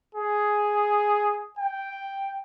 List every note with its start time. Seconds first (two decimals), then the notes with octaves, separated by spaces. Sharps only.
0.15 G#4
1.59 G5